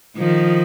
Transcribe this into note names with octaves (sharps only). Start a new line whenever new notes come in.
D#3 F3